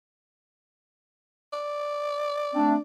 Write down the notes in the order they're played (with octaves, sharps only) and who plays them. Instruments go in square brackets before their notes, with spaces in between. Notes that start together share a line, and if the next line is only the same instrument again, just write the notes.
[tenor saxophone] D5
[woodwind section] A3 C4 D4